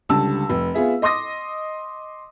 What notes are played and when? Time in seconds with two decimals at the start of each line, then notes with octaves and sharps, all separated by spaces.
0.09 C#2 D3 G3 A5 E6
0.50 F1
0.74 B3 F4 G#4 E5
1.02 D#5 C6 D6 D#6 A#6